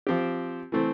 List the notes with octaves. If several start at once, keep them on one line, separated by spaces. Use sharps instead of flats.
F3 C4 G4
E3 A3 C4